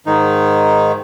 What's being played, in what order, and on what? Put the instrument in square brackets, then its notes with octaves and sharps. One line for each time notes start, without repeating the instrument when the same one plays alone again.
[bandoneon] G#2 D#3 D#4